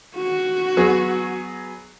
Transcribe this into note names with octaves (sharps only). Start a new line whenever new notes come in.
F#4
F#3 B3 G#4